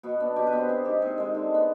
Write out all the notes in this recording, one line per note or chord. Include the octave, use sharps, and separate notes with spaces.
B2 B3
B3 D4
B2 G4
B4
B3 C5
C3 G#4
D#3 G#3 G4
C3 G#4
D#3 G#3
D3
G#3 B3